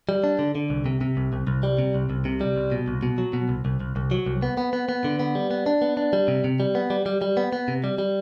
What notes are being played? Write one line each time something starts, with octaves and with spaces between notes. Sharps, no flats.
G3
D4
D3
D3
C2
C3
C3
C2
C2
C2
G3
C3
C2
C2
C3
G3
C2
B2
C2
B2
F#3
B2
C2
C2
C2
C2
F#3
C2
B3
B3
B3
B3
D3
B3
G3
B3
D4
B3
D4
G3
C3
C3
G3
B3
G3
G3
G3
B3
B3
C3
G3
G3